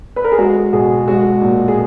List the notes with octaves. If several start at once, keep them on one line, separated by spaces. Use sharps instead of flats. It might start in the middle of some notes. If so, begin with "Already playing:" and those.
B4
A#4
G#4
G#3 F#4
B2 G#4
G#3 F#4
A#2
G#4